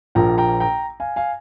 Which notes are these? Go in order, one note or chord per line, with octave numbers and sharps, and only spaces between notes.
A#1 A#2 F3 A#3 G5 A#5
G5 A#5
G5 A#5
F5 G#5
F5 G#5